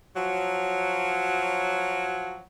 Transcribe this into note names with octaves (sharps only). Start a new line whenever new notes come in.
F3 F#3